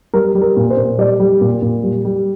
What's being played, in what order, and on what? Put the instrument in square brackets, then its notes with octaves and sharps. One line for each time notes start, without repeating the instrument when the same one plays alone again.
[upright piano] G3 A#4
G3
A#4
A#2
C5
A#2
G3 D5
G3
A#2
A#2
G3
G3